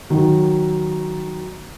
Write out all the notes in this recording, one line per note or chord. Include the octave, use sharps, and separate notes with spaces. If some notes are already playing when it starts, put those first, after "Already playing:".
D#3 F#3